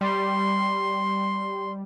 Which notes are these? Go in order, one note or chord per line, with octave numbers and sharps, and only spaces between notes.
G3 C6